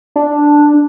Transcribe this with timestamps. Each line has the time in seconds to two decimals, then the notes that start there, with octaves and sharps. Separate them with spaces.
0.16 D4